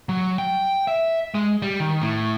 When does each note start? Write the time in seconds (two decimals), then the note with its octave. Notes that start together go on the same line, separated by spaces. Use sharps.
0.09 F#3
0.38 G5
0.88 E5
1.34 G#3
1.62 G3
1.80 D#3
2.02 A2